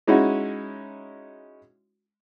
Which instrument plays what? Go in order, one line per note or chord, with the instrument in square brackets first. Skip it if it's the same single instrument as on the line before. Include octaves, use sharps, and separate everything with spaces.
[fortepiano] G#3 C#4 D#4 E4 F#4